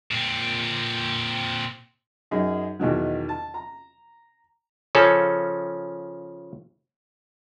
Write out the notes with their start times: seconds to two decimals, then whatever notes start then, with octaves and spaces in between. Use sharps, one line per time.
0.11 A#2 C4
2.31 F#2 D#4 G#4
2.79 E2 B2 D#3 F#3
3.29 A5
3.54 A#5
4.95 C#3 F3 C#4 A4